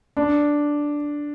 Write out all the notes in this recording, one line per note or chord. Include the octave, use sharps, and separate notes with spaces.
D4